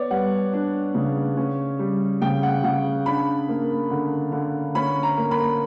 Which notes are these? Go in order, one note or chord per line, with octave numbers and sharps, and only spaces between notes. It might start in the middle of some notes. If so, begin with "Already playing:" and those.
Already playing: B3 C#5 D5
G3 F#5
D4
C#3
C#4
G3
C#3 G5
F#5
C#3 F#5
D4 B5
A#3
D3
D3
C#4 B5
A#5
A#3
B5